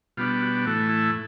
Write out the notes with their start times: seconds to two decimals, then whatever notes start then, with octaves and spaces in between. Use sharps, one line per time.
0.17 B2 G3 B3 D4 F4
0.42 F#4
0.65 A2 E3 A3 F#4
0.89 E4